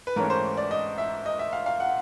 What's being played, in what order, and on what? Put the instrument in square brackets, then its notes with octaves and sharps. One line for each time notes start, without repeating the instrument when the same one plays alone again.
[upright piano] B4
G#2 E3 A3 C#4 A#4
C5
D5
D#5
E5
D#5
E5
F5
F5
F#5